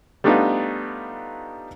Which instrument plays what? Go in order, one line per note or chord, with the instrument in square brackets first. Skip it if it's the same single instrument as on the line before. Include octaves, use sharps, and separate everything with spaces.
[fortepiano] G3 A3 B3 D4 D#4 F4